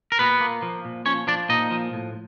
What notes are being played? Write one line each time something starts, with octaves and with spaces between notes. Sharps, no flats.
A#4
A#2 B3 B4
A#3
F3
A#2
F3 C#4 C#5
F3 D4 D5
A#2 D#4 D#5
F3
A2